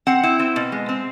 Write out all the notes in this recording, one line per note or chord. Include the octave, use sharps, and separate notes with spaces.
C4 F#5
E4
C4
B2
G#3
C4